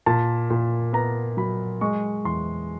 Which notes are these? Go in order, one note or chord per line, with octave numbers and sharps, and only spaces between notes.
A#2 A5
A#2
B3 A#5
F#3 B5
G#3 C#6
E2 C6